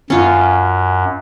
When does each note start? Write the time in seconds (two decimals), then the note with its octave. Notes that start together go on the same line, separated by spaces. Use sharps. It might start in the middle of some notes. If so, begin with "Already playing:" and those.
0.10 F#2 C#4 F4